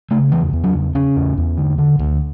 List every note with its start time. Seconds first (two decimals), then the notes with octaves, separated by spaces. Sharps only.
0.11 C#3 A3
0.32 E2 E3
0.53 E2
0.64 F#3
0.74 C#3
0.95 C#3 C#4
1.16 E2
1.37 E2
1.57 D3
1.78 D3
1.99 D2